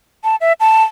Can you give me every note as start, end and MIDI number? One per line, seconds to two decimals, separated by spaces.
0.24 0.36 81
0.41 0.53 76
0.60 0.83 81